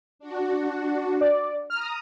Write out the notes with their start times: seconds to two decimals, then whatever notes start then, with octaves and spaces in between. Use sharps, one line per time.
0.19 D4 F#4
1.21 D5
1.70 A#5 D#6 F6